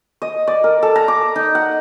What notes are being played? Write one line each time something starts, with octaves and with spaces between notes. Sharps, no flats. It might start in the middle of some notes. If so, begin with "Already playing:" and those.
D#5
D5
A#4
A4
A#5
D6
D#4
F#5